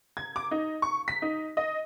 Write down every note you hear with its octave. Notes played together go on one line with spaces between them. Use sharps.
G#6
D6
D#4
C#6
B6
D#4
D#5